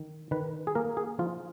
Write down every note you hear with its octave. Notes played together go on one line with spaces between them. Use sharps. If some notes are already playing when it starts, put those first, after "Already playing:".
Already playing: D#3
D#3 B4
G#4
A#3 A#4
G#4
F3 F4